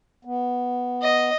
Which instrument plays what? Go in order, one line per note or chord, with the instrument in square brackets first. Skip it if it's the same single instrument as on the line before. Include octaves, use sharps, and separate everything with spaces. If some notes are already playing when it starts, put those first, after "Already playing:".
[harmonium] B3
[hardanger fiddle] D#5